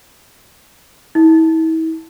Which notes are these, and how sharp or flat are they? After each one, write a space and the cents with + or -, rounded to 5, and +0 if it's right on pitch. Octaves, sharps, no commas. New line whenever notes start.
E4 -40